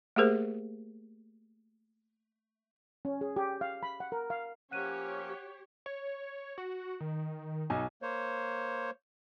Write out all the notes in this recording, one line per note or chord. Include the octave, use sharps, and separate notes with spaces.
A3 A#3 G4 G#4 A#4 C5
C#4
G#4
G4
F5
B5
F#5
A#4
F5
F3 A#3 C#4 G4 C#5 F#5 F#6 D#7
C#5
F#4
D#3
B1 D#4 G#5
A#3 C5 C#5